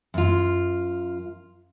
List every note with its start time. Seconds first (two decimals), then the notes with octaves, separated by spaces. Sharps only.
0.14 F#2 F4